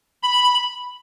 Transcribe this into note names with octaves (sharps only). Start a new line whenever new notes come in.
B5